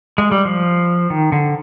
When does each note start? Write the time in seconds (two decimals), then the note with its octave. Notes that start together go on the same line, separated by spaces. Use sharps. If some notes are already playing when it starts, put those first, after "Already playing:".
0.18 G#3
0.31 G3
0.45 F3
1.10 D#3
1.32 D3